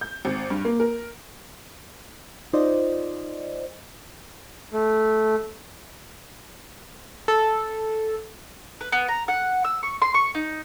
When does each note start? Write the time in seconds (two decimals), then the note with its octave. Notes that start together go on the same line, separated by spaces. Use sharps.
0.01 G6
0.25 G#1
0.50 G2
0.65 A#3
0.80 A#4
2.53 D#4 F4 C5 D5 D#5
4.73 A3
7.28 A4
8.81 B4
8.92 B3
9.08 A#5
9.28 F#5
9.64 E6
9.83 C#6
10.02 C6
10.14 C#6
10.35 D#4